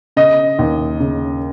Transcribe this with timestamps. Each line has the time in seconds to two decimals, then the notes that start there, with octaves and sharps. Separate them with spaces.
0.16 C#3 D#5
0.59 D#2
1.00 C#3